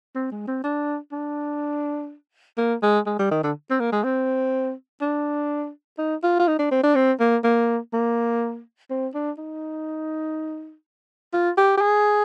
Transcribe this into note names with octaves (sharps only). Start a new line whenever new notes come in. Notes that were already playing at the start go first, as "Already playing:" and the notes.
C4
G#3
C4
D4
D4
A#3
G#3
G#3
G3
D#3
D3
C4
A#3
G#3
C4
D4
D#4
F4
F4
D#4
D4
C4
D4
C4
A#3
A#3
A#3
C4
D4
D#4
F4
G4
G4
G#4